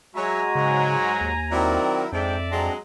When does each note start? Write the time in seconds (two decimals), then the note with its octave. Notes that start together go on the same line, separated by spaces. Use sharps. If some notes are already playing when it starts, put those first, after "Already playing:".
0.15 F#3 G#3 F#4 C#5 E5 G#5 A#5
0.55 G#2 C#3 F#3
1.21 D#2
1.52 D#3 F#3 C4 E4 A#4 D5
2.12 F2 G#2 D4 D5 E5 G5
2.50 F#3 G#3 C4 D4 A#5